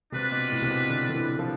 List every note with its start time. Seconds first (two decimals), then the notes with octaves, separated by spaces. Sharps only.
0.12 C3 D4 F4 B4
0.32 B2
0.51 A2
0.62 C3
0.70 B2
0.89 D3
1.09 D3
1.15 E3
1.39 F3